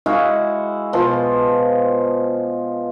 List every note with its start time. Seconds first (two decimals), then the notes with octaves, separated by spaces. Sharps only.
0.06 G#3 E4 F#4 F5
0.93 B2 F3